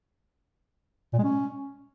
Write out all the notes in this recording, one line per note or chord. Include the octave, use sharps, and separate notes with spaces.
A#2
G#3
C#4